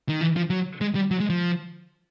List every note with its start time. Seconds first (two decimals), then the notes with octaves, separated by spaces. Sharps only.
0.09 D#3
0.21 E3
0.36 F3
0.50 F#3
0.81 G#3
0.95 G3
1.11 F#3
1.20 G#3
1.30 F3